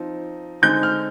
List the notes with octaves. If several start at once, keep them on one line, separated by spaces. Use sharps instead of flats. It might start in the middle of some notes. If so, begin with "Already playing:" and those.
Already playing: F3 C4 D#4
D3 G#3 C4 D#4 G6
F6